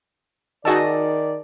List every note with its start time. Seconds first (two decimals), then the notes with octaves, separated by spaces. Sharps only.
0.65 D#3 D#4 F#4 G#4 D5 D#5 A5 E6